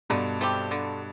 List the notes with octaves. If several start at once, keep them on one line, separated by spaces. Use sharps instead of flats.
G2 B2 D3
A3 C4 G4
D3